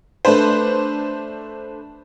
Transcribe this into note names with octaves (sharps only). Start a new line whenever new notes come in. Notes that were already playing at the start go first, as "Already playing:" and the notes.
A3 D4 B4 C5